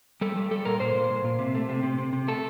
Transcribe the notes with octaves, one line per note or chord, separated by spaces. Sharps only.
G3 A4
G3
G3 A4
A#2 A#4
A#2 C5
A#2
A#2
A#2
C3
A3
C3
C3
C3
C3
A3 A4